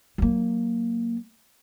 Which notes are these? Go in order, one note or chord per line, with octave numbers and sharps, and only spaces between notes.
F#3 A#3